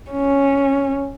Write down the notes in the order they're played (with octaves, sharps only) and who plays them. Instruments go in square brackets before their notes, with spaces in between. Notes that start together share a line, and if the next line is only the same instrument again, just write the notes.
[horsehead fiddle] C#4